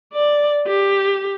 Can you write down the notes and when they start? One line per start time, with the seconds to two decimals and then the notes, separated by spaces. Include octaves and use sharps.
0.13 D5
0.68 G4